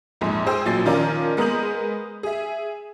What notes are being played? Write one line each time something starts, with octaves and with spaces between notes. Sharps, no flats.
A#1 F2 G#2
G#4 C5 G5 E6
A1 A#2 F#3 C6 A6 C7
D#3 F3 C#4 F4 A#4 D5
G#3 B3 A#4 D#6 G6 F#7
G#4 E5